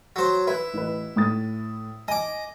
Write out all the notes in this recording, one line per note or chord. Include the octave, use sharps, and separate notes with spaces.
F#3 C5
E4 B4
A1 B4
A2 D#6 A6
D#5 G#5 D6